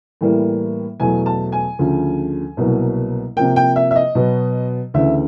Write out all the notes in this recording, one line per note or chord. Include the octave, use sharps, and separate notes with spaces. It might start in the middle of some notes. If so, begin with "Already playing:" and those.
A2 E3 G3 A#3
E2 B2 F#3 A3 G#5
A5
G#5
D2 C#3 F3
C2 B2 F#3 A#3
C3 F3 A#3 G5
G5
E5
E5
D#5
B2 F#3 B3
D2 C#3 E3 E5